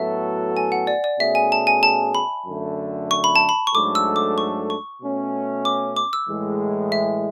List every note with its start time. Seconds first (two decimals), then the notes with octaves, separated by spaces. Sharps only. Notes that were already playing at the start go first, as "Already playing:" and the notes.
Already playing: A2 F#3 B3 F#4 A4 E5
0.57 G#5
0.72 F#5
0.87 D5
1.04 D5
1.20 B2 A3 C#4 G#4 E5
1.35 G#5
1.52 A5
1.67 G#5
1.83 A5
2.15 B5
2.46 F#2 D3 A3
3.11 C#6
3.24 B5
3.36 A5
3.49 B5
3.67 C#6
3.74 G#2 F#3 A3 D4 A4 D6
3.95 E6
4.16 D6
4.38 C#6
4.70 C#6
5.01 B2 A3 C#4
5.65 D6
5.97 D6
6.13 E6
6.28 A2 E3 G#3
6.92 E5